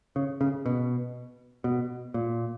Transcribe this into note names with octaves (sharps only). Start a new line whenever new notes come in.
C#3
C#3
B2
B2
A#2